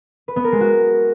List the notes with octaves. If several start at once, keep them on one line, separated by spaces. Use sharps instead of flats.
B4
B3
A#4
G#3
F#4